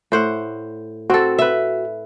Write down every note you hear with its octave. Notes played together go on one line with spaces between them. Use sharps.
A2 C5 F#5
C4 F#4 A4
B4 E5